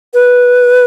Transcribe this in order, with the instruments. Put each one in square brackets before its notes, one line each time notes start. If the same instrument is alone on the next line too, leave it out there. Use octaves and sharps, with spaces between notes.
[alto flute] B4